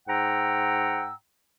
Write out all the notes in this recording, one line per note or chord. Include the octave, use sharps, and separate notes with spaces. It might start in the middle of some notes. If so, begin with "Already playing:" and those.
G#2 F#5 G5 A#5 E6